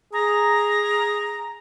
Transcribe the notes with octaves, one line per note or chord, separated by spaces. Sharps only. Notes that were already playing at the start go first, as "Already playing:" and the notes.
G#4 A#5